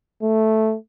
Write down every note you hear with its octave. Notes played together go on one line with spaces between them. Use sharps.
A3